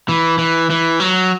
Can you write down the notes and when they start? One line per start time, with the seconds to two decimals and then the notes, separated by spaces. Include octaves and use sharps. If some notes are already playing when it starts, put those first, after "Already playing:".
0.09 E3
0.38 E3
0.70 E3
1.00 F#3